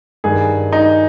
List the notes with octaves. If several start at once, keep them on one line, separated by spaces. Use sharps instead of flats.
G2 D#3 G#4
D#4